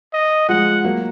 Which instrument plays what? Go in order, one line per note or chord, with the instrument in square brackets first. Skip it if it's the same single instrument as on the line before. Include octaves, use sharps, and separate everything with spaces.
[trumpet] D#5
[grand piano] F3 G#3 [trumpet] F#5
[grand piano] F#3 A#3